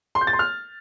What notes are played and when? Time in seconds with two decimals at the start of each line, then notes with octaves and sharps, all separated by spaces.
0.15 C6
0.21 G6
0.27 A6
0.33 C6
0.39 F6